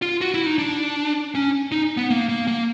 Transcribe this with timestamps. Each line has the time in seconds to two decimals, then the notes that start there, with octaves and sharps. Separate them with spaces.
0.02 F4
0.21 F#4
0.34 E4
0.46 D#4
0.58 D4
1.35 C#4
1.72 D#4
1.97 B3
2.10 A#3
2.29 A#3
2.47 A#3